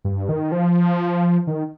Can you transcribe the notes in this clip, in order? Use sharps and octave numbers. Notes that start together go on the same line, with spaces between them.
G2
D#3
F3
D#3